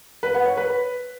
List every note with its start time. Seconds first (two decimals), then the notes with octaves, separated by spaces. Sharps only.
0.23 B4
0.34 F#5
0.46 C#5
0.57 B4